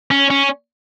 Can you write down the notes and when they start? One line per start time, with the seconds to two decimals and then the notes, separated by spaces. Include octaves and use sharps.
0.11 C#4
0.30 C#4